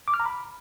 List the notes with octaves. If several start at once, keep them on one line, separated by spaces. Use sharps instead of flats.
D6
F6
A#5
B5